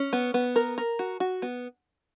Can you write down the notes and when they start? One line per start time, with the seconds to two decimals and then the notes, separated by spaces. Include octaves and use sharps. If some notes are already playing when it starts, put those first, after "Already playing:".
Already playing: C#4
0.13 B3
0.34 B3
0.56 A#4
0.78 A#4
0.99 F#4
1.20 F#4
1.42 B3